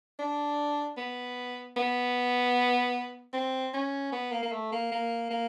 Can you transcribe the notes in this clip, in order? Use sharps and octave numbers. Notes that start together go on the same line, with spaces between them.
D4
B3
B3
C4
C#4
B3
A#3
A#3
A3
A#3
A#3
A#3